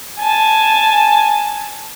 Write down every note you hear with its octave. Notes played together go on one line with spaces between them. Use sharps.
G#5 A5